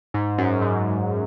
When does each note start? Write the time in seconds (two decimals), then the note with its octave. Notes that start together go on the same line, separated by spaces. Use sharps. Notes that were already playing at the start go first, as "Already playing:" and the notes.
0.14 G#2
0.38 F#2
0.62 G#2